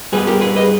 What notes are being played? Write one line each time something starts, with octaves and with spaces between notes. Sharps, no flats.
G2 G3 B3 G#4 B4
G4 A#4
G#4 B4
B4 D#5